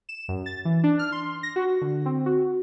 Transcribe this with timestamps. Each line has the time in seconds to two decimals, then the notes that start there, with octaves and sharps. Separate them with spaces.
0.09 E7
0.28 F#2
0.46 A6
0.65 E3
0.84 D4
0.99 F6
1.12 C6
1.43 A#6
1.56 F#4
1.81 D3
2.06 C4
2.26 F#4